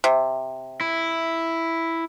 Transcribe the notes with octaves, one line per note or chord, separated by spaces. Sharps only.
C3
E4